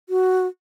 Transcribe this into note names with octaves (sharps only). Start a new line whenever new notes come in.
F#4